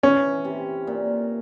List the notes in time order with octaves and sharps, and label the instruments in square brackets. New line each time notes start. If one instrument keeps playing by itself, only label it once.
[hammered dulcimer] E3 [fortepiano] C#4
[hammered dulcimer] C3
A#2